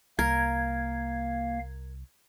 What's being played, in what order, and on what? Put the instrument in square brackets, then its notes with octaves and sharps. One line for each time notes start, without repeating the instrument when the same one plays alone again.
[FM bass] C2 [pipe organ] A#3 F5 [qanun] A#4 [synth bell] G#6